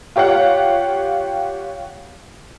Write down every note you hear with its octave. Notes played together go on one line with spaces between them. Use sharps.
F4 G4 C#5 F5 F#5